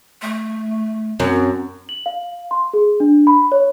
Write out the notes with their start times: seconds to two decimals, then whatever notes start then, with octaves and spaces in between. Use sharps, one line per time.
0.22 A3
1.20 F#2 C4
1.89 F#7
2.06 F5
2.51 C6
2.74 G#4
3.00 D4
3.27 B5
3.52 C#5